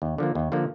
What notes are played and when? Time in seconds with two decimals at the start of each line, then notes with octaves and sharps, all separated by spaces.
0.02 D#2
0.18 D3 F3 A#3
0.35 D#2
0.52 D3 F3 A#3